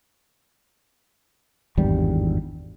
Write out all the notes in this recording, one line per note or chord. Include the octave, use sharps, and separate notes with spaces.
G#1 E2 G2 G3